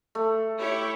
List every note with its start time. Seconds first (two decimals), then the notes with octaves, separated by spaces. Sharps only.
0.15 A3
0.59 E4 G4 C#5